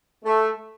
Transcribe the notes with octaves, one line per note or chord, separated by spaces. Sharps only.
A3